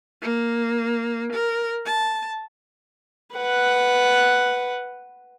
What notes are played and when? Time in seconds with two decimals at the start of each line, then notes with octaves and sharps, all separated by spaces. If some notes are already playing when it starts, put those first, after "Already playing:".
0.22 A#3
1.32 A#4
1.85 A5
3.36 B4 F#5